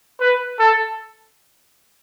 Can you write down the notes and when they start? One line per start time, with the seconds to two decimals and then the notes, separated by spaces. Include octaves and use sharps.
0.20 B4
0.59 A4